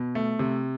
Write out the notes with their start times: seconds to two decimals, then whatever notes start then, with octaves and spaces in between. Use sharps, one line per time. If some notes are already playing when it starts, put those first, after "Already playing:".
Already playing: B2
0.15 A3
0.39 C3